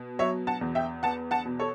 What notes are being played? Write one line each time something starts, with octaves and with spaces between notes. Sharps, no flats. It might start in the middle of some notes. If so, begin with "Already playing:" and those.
Already playing: B2
F#3 C#5 E5
F#5 A5
E2
E5 G5
B3 F#5 A5
F#5 A5
B2
A4 C#5